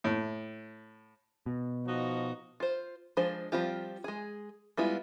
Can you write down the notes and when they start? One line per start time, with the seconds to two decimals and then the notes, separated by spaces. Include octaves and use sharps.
0.04 A2
1.46 B2
1.86 F3 D#4 F#4
2.60 F4 C5
3.17 F3 G#3 D4 G#4 C5
3.52 F3 G3 C4 F4 G4
4.04 G#3 G#4
4.77 G3 G#3 B3 E4 F4